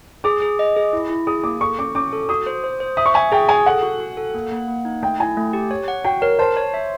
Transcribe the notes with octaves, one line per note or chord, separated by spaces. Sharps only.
G#4 D6
G#4
D#5
G#4
E4
E4
G#4 D#6
A#3 D6
A4 C#6
C#4 D6
C#4 D6
A4
F#4 D#6
C5
C5
C5
E5 D#6
C#6
E5 G#5
G#4 G5
G#4 G#5
A4 F#5
F#4
F#4
A4
A#3
A#3
A#3
D#4
A3 G5
E4 G#5
A3
G4
C#5
F#5
F#4 G5
A#4 C#5
C5 A5
C#5
E5